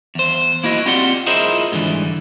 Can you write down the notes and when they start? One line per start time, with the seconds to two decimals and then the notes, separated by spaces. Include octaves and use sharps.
0.15 E2 C5
0.64 A#3 E4 F#4 D#5
0.86 C4 F4 G4 D5 F#5 C6
1.27 E4 F4 G#4 A#4 C5 D#5
1.72 G#2 D3 E3 G3